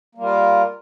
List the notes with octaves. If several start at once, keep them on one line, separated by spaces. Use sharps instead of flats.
G3 A#3 F4 A#4